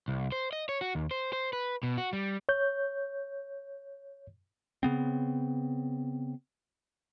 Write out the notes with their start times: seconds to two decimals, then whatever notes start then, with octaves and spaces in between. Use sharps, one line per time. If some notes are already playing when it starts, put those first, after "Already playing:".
0.08 C2
0.32 C5
0.53 D#5
0.69 C#5
0.81 F#4
0.95 D#2
1.11 C5
1.33 C5
1.53 B4
1.83 B2
1.98 F#4
2.13 G3
2.49 C#5 G6
4.83 C#3 B3 C4